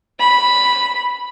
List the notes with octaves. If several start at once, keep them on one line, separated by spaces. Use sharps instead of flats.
B5